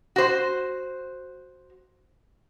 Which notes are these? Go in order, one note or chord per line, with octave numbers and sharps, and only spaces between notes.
F#4 C5